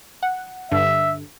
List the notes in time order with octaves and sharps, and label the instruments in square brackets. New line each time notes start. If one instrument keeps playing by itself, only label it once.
[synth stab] F#5
[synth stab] G2 D3 [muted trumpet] E5